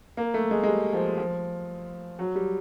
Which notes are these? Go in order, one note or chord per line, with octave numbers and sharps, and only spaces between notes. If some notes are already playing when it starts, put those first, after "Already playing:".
A#3
A3
G#3
G#3
G3
F3
F3
F#3
G3